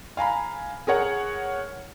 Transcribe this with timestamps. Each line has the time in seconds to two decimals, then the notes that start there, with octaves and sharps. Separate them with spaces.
0.17 F5 G#5 A#5 B5
0.87 G#4 A#4 C#5 F#5